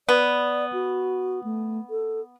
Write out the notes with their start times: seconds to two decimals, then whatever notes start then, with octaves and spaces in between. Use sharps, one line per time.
0.09 B3 D5
0.73 F#4
1.44 A3
1.90 A4